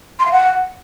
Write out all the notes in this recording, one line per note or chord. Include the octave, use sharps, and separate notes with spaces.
C6
F5
F#5